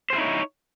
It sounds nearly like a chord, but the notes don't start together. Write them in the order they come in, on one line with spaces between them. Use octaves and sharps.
C5 G#4 E4 D#4 C#5